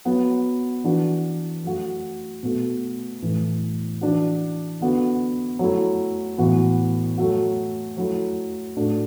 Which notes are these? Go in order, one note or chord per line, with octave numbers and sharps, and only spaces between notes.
F#3 B3 F#4
E3 D4 F#4
F#3 A3 F#4
B2 A3 F#4
A2 E3 A3
E3 D4 F#4
D3 B3 F#4
F#3 A3 E4
A2 E3 B3 F#4
F#3 A3 F#4
F#3 A3 E4
A2 A3 D4 F#4